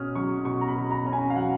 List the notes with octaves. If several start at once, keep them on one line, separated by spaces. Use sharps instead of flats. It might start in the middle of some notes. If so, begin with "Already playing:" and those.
Already playing: B2 C#4 D#6 F6
F#3 C#6
B2 C#6
A#5
B5
B2
A#5
C#4 A#5
G#5
F5
F#3 F#5